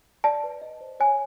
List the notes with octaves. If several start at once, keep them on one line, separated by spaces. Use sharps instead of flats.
D5 A5
B4
D#5
C5
C#5 G#5